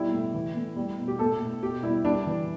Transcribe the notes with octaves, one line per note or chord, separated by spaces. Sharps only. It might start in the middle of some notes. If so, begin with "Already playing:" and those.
Already playing: B2 G3 E4
A2
E3
A2
G3
B2
G4
A2 A4
A2
B2 G4
G3 E4
G3 D4
E3